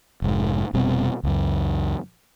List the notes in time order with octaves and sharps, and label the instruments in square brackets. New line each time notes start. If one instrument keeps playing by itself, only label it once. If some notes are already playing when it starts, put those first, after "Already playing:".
[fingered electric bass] F1 G#2
F1 B2 G3 C4
C#2 F#2